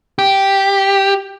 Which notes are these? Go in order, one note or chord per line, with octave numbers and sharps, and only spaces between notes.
G4